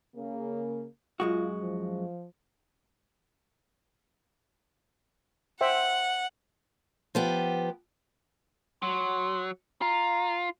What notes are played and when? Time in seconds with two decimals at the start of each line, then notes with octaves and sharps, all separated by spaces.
0.16 C#3 A#3
1.20 F#2 G#3 F4 F#4
1.61 F3
5.61 C5 E5 F#5 G5
7.15 F3 B3 G4
8.83 F#3 C6
9.82 F4 A#5